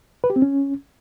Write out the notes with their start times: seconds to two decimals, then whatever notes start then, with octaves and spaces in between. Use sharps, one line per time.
0.24 B4
0.30 G4
0.36 C4
0.42 C#4